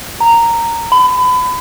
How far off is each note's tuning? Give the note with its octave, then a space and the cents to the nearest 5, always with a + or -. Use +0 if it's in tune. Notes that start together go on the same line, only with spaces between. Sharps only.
A#5 -10
B5 +30